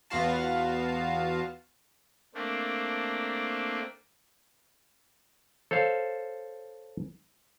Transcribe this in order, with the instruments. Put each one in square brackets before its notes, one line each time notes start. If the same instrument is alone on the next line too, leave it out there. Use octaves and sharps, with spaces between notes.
[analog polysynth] E2 B3 F4 F#4 F5 A5
[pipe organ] A3 A#3 C4 D4
[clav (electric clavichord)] A4 C5 C#5 F5